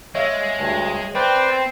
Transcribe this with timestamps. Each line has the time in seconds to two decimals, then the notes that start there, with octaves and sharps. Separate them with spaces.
0.15 G#3 C#5 E5 F5
0.57 D2 G2
1.15 C4 B4 C5 D5 G5